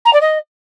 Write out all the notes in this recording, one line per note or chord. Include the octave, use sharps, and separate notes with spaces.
A#5
D5
D#5